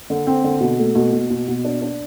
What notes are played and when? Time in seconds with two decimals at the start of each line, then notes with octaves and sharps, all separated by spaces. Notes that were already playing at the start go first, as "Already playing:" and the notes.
0.10 D3
0.27 C4
0.44 D3
0.60 B2
0.79 A3
0.95 B2
1.13 B2
1.30 B2
1.48 B2
1.65 D4
1.82 D4